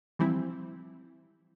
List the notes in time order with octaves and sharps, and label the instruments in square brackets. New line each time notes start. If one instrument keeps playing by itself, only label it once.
[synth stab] E3 F3 G3 C4 E4